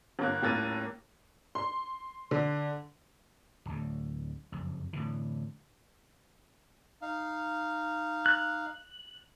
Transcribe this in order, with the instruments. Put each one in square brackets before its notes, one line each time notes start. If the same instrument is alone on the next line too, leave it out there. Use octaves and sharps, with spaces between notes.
[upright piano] G1 A#3 F#6
D#1 A2 A#3 A6 D#7
[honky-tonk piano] C6
D3
[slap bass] D1 D2
F#1 F2
A2 D3 E3
[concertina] D#4 F5
[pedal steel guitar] F#6